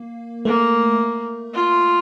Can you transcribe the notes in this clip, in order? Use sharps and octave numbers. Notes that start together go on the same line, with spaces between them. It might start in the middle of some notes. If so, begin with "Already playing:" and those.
Already playing: A#3
A3 A#3
F4